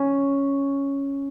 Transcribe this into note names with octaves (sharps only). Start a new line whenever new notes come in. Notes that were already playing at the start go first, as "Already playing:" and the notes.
Already playing: C#4